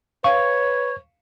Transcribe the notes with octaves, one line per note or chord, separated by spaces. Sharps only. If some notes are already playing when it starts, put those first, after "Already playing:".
B4 C#5 F5 C#6